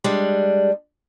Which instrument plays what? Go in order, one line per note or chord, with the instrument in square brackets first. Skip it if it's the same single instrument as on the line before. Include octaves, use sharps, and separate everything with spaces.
[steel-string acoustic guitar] G3 G#3 D4